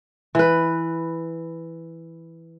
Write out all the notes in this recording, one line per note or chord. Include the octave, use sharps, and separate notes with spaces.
E3 B4